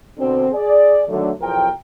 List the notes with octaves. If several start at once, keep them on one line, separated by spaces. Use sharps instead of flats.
B2 D3 C4
G#4 D5
D3 D#3 F#3 A3
B1 E2 F3 A#4 G5